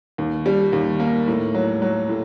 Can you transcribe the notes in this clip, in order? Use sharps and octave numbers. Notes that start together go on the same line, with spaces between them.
D#2
G3
D#2
A#3
A2
F#3
F#3
A2